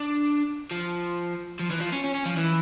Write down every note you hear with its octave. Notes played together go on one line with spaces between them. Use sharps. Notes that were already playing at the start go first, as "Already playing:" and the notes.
Already playing: D4
F3
F3
E3
F3
C#4
C#4
C#4
F3
E3